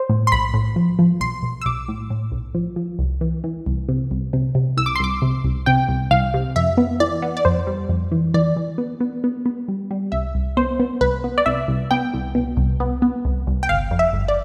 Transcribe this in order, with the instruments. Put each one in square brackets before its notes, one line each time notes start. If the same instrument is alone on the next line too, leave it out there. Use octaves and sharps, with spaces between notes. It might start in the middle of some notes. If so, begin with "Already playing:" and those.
Already playing: [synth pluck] C5
A2
C6
B1 B5
A2
F3
F3
B1 C6
B1
E6
B1 D6
A2
A2
B1
F3
F3
C2
E3
E3
C2
C3
C2
C3
C3
C2 E6
D6
C6
C2 D6
C3
C2
C3 G5
C2
C2 F5
C3
F2 E5
B3
E3 D5
B3
D5
F2 C5
G3
F2
E3
E3 D5
E3
B3
B3
B3
B3
G3
G3
C2 E5
C2
B3 C5
B3
C2 B4
B3
D5
C2 E5
C2
B3 G5
C2
B2
C2
B3
B3
C2
C2
G5
G1 F5
F2
E5
G1
D5